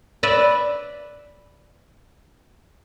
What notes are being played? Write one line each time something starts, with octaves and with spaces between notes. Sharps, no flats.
B4 D5 E5